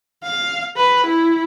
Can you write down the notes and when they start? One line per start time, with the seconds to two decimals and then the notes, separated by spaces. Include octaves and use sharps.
0.23 F5
0.76 B4
1.06 E4